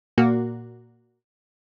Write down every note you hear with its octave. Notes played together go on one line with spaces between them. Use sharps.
A#2 A#3 F#4